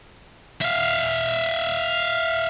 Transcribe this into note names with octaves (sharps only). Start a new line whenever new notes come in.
E5 F5